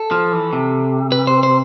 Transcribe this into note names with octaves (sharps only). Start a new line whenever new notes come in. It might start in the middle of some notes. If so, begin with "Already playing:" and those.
Already playing: A4
F3
E3
C3
B4
C5
C5